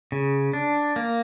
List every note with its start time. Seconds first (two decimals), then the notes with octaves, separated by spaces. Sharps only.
0.12 C#3
0.53 D4
0.96 A#3